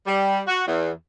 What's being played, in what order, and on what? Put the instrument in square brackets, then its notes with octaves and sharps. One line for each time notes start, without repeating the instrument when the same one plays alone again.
[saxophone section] G3
F#4
E2